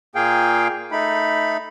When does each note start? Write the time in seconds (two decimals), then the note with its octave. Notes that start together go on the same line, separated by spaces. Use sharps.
0.15 A#2 A#3 G#4 F5 G5
0.92 A3 D#4 B5